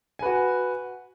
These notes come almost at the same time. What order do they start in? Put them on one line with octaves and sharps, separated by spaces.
G#5 B4 F#4